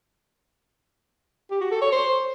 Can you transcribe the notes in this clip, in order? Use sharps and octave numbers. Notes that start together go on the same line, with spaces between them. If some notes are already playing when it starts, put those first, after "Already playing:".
G4
F#4
A4
C#5
C5